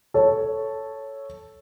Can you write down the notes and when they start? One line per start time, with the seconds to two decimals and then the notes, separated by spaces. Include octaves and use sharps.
0.14 A4 C#5